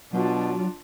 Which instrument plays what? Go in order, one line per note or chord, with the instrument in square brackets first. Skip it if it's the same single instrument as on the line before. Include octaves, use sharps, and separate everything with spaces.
[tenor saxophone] B2 [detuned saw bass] F#3 [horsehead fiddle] D4 F4